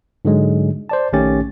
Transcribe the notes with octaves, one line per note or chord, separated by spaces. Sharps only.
G#2 D3 F#3 G#3
C5 D5 A5
A#1 D#3 A3 C#4 G4 A6